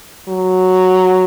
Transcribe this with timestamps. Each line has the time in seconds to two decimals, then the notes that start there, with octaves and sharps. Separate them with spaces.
0.28 F#3